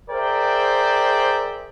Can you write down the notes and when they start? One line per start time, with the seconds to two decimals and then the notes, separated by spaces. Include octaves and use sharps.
0.10 G#4 A#4 C5 D5 E5 G5